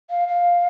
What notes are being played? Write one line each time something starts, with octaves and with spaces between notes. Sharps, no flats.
F5
F5